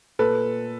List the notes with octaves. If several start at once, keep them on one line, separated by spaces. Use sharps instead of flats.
A#2 A4 B4